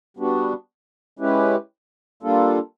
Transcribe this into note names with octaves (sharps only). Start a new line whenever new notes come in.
G3 B3 D4 F#4
G#3 C#4 E4 G4 B4
G3 A#3 D4 F4 A4